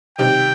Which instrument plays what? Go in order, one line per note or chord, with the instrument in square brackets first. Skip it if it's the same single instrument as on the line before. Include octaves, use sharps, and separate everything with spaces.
[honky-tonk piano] C3 D#3 G3 C4 G4 [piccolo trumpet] G5